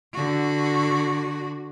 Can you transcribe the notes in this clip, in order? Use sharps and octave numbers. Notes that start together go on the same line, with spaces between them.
D3 F#4